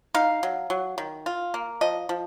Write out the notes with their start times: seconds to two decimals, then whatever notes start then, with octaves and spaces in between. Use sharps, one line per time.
0.14 D#4 F5
0.43 F#3
0.70 F#3
0.98 D#3
1.26 F4
1.54 A#3
1.81 F3 D#5
2.09 F3